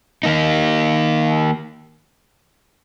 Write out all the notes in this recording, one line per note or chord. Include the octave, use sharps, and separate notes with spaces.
D#3 A#3 D#4